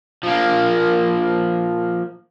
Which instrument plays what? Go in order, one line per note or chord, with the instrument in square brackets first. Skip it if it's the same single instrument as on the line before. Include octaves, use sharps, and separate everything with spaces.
[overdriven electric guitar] F3 A#3